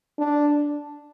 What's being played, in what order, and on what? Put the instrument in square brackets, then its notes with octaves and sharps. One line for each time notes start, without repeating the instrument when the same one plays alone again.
[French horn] D4